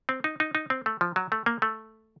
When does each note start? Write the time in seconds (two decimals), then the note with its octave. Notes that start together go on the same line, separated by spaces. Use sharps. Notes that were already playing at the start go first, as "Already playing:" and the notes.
0.09 C4
0.24 D#4
0.40 D#4
0.55 D#4
0.70 C4
0.86 A3
1.01 F3
1.16 F#3
1.32 A3
1.46 A#3
1.62 A3